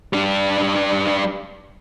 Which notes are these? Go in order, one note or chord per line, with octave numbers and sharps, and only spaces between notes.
G3 D4